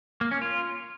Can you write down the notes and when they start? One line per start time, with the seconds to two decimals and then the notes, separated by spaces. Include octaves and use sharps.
0.21 A#3
0.31 C#4
0.42 F4